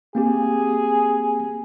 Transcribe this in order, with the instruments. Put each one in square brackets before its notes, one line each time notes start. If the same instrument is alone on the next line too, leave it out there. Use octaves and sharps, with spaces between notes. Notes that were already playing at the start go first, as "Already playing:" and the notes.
[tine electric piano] A#3 C4 G4 [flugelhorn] G#4